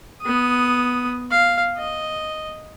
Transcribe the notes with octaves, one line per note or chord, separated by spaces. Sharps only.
B3 D#6
F5
D#5